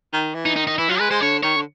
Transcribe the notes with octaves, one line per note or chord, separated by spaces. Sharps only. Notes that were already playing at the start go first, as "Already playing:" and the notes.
D#3
E3
D#4
D#3 D#4
D#4
E3 E4
F#3 F4
G#3 B4
G#3 C5
D3 C#5
D#3 C#5
D3